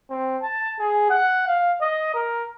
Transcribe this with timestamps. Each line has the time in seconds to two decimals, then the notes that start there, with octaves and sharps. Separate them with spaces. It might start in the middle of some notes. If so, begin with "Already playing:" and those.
0.10 C4
0.43 A5
0.79 G#4
1.10 F#5
1.48 F5
1.81 D#5
2.15 A#4